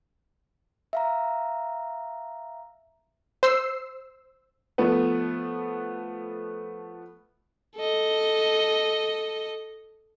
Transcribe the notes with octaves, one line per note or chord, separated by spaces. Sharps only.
E5 F5 A#5
C5 E6 C7
F3 A3 B3 B4
A4 D#5